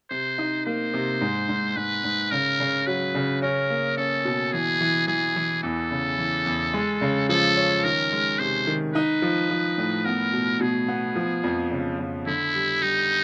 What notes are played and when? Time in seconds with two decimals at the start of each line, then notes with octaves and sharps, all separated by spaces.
0.10 C3 C5
0.38 D#4
0.66 A#3 C5
0.94 C3
1.21 G#2
1.49 G#2
1.76 G#2 B4
2.04 G#2
2.31 C#3 A#4
2.60 C#3
2.87 F#3 B4
3.15 C#3
3.42 C#4 A#4
3.70 A#3
3.97 C#4 A4
4.25 B2
4.53 E3 G#4
4.81 E3
5.08 E3 G#4
5.36 E3
5.63 E2 A4
5.91 C#3
6.18 E3
6.46 E2
6.74 G#3
7.01 C#3
7.29 F3 A4
7.57 C#4
7.84 D#3 A#4
8.12 G#3
8.39 C3 C5
8.67 D#3
8.94 D#4 B4
9.22 F3
9.50 F3
9.78 A2
10.05 B3 A#4
10.33 B2
10.60 B2 G#4
10.88 B3
11.16 F3
11.44 F2
11.71 C#3
11.99 F2
12.26 D3 E4
12.54 G3
12.81 G3 D#4